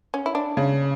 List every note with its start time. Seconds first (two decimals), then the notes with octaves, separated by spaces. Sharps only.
0.14 C#4
0.26 E4
0.35 D4
0.57 C#3